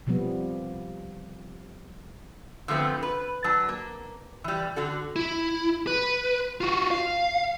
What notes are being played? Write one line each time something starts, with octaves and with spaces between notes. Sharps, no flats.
C3 F3 G3 B3
D3 F3 A3 B3 C4
B4
F#3 D4 A5
A#3
E3 G3
D3 F#4 A4
E4
B4
F4 F#4
F5